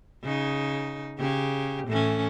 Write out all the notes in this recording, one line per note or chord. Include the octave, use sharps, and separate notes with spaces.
C#3 D#4
C#3 G4
A2 E3 C#4